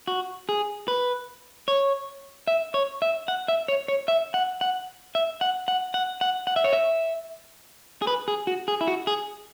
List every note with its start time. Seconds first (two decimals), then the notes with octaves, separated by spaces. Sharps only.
0.08 F#4
0.49 G#4
0.88 B4
1.68 C#5
2.48 E5
2.74 C#5
3.02 E5
3.28 F#5
3.48 E5
3.68 C#5
3.88 C#5
4.08 E5
4.34 F#5
4.61 F#5
5.15 E5
5.41 F#5
5.68 F#5
5.94 F#5
6.21 F#5
6.47 F#5
6.56 E5
6.64 C#5
6.73 E5
8.02 G#4
8.07 B4
8.28 G#4
8.47 F#4
8.68 G#4
8.81 E4
8.88 F#4
9.07 G#4